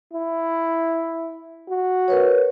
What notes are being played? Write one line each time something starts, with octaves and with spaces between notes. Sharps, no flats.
E4
F#4
A#4 B4 C#5